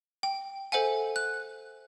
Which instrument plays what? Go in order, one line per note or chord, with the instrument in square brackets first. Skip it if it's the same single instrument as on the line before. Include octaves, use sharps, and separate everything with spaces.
[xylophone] G5
A4 C5 E5 F#5 G#5
F#6